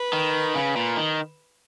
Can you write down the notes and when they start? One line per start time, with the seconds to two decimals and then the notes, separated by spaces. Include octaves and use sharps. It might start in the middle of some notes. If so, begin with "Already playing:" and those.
Already playing: B4
0.13 D#3
0.55 C#3
0.76 A#2
0.97 D#3